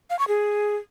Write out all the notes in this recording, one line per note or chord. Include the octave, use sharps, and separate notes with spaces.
F5
C#6
G#4